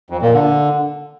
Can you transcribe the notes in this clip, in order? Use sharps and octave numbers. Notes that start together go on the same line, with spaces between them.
F2
A#2
D3